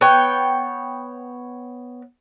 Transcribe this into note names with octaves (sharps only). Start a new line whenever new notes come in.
B3 C#5 G5